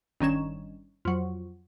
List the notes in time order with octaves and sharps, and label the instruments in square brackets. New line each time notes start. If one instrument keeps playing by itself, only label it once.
[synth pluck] G1 D#3 C#4 E7
F2 F#3